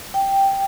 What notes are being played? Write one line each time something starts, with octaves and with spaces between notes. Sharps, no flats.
G5